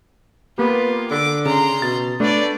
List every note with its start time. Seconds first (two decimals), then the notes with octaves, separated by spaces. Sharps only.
0.58 A#3 B3 F4 G4
1.11 D3 D6
1.45 C#3 A#5 C6
1.82 B2 A6
2.20 A3 B3 D4 D5